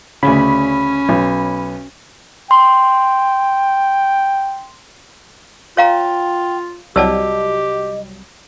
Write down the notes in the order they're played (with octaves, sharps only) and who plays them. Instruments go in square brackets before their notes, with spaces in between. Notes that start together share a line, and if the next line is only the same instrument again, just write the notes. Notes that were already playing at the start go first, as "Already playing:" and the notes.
[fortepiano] D2 C#3 [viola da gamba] C#4 [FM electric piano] B5
[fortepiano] B1
[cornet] G5 [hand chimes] C6
[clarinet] F4 [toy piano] C#5 F5 A#5 [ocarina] G5
[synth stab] C2 F#3 G3 [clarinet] G4 [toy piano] D5 A5 E6 [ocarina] D#5